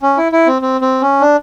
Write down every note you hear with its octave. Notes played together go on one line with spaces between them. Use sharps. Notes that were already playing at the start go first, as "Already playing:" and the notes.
C#4
E4
E4
C4
C4
C4
C#4
D4